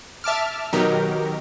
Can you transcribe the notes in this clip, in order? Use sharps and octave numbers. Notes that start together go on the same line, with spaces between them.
E5 A5 D6 F6
B2 D#3 F#3 D#4 G4 A#4